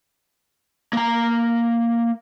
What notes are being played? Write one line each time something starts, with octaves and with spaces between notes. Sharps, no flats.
A#3 A#5